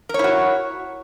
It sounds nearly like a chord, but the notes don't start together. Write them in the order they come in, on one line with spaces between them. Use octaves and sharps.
A#4 C#5 E4 F#4